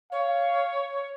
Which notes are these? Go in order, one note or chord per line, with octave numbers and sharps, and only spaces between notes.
C#5 F5